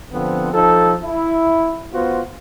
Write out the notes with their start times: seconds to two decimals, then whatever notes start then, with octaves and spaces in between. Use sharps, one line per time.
0.13 D3 F3 B3 C4
0.53 F3 D#4 A4
1.02 E4
1.93 B3 F4 F#4 C5